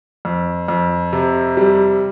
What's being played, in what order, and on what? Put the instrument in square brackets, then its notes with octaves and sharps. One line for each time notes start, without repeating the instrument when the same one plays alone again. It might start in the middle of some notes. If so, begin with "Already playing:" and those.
[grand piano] F2
F2
C3
G3